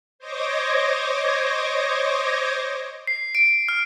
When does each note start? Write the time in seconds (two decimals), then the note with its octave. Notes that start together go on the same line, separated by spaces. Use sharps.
0.19 C5 C#5 D#5 D6 G#6 A#6
3.07 C7
3.35 D7
3.69 F6